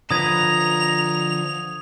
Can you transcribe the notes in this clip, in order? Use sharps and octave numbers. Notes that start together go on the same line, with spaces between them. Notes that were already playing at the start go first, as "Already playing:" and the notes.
D3 F3 B4 A#5 D#6 G#6 F7